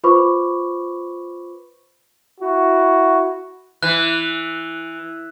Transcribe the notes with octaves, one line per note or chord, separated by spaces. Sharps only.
F4 B4 C5 B5 C#6 D6
E4 F#4
E3 F#6